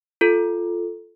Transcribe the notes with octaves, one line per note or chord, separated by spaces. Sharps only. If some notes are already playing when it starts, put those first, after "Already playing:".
F4 A4